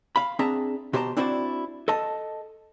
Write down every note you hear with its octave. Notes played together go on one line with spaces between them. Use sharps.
F5 B5
C4 D4 G#4 E5 A5 A#5
B2 G4 C5 D5 A5 A#5
C4 D4 E4 F#4 C5 D5
A4 D#5 A5